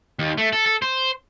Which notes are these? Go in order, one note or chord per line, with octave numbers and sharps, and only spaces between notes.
D#2
A3
A4
A4
C5